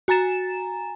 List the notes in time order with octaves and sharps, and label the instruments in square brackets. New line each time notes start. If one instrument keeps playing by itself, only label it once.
[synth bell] F#4 G#5 A#5 A6 E7